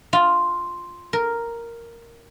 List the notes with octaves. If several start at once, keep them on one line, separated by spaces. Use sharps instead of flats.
F4
A#4